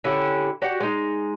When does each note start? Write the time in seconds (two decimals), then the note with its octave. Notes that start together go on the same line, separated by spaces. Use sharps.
0.04 D3 C#4 E4 G4
0.62 F#4 G4 D5 F#5
0.80 G#3 D#4